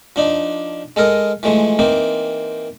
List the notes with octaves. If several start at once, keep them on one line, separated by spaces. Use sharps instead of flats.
F3 D4 D#4
G#3 A4 A#4 D#5
E3 F3 G#3 A3
E3 A#3 C4 D#4